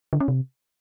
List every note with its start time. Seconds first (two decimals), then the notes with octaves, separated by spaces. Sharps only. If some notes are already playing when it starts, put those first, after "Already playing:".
0.13 D3
0.20 C#4
0.28 C3